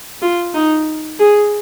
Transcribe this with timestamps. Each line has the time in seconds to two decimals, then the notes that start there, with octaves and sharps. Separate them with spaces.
0.22 F4
0.54 D#4
1.19 G#4